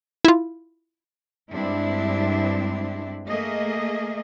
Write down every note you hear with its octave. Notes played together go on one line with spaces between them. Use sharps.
E4 F4
G2 G#3 C4 D4 E4
A3 A#3 G#4 D#5